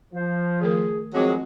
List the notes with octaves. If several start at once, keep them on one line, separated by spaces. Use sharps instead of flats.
F3 C5
D#3 A3 G#4 A#4
F2 D#3 F#3 G#3 C4 G#4 D6